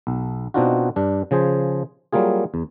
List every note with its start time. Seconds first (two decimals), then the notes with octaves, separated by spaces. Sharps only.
0.07 B1
0.54 B2 C4 D4 D#4 F4 F#4
0.96 G2 D4
1.31 C#3 F3 G#4 C5
2.13 F#3 G3 A#3 F4 G#4
2.54 E2